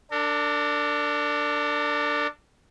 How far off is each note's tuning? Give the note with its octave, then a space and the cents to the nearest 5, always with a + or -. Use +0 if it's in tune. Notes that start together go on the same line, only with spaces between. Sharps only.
D4 +0 A#4 -45